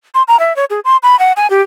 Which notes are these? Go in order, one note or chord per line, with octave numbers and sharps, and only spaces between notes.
C6
A#5
E5
C#5
G#4
C6
B5
F#5
G#5
G4